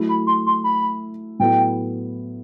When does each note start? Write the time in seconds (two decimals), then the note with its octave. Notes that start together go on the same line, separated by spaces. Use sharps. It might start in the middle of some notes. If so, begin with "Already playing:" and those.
Already playing: F#3 A3 E4
0.09 B5
0.27 C6
0.47 C6
0.64 B5
1.39 A2 F#3 B3 E4 A4 G5